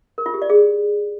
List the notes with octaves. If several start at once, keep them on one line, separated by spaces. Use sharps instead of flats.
A#4
F4
G4
D5
G#4